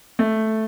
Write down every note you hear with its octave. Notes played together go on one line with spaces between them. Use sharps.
A3